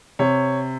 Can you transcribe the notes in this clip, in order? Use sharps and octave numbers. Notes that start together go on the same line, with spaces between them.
C3 C#5